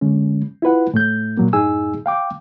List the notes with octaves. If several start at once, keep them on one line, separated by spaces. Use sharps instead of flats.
D3 G#3 C#4
E4 F4 B4 F#5
A2 A3 G6
A#2 F#3 A#3
F#2 A2 D#4 G#4 G#5 E6
F5 G5 D6